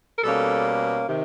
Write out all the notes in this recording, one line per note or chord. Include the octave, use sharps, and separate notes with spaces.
A#4
B2 G3 A#3 C#4 A4
C3 D#3